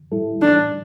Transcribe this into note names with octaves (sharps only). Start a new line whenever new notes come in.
A2 G3 E4 A4
A2 E3 G3 D4